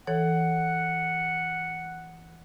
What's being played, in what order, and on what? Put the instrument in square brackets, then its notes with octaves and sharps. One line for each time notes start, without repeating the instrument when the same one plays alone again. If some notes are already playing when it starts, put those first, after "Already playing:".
[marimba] E3 A4 C#5 [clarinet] F#5